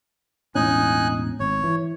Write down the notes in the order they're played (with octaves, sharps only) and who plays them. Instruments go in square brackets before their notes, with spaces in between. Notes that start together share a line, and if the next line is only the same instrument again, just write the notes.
[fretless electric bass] E1 A2 C#4 [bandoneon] D#4 G#5 F#6
[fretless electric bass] G#1 [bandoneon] C#5
[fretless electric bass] E3